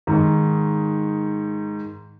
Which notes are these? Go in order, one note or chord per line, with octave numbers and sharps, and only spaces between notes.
G#2 D#3